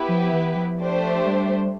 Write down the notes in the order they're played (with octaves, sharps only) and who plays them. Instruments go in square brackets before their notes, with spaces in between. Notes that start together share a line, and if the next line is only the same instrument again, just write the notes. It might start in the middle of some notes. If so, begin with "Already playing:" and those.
Already playing: [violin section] B3 E4 G4 B4
[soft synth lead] F3
E3
F3
[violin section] A3 D4 G4 C5
[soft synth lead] G3